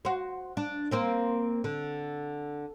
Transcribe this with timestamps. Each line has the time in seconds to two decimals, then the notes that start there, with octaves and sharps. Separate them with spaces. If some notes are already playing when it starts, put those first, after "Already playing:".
0.05 F#4 C5
0.57 D4
0.91 A#3 C4 C5
1.64 D3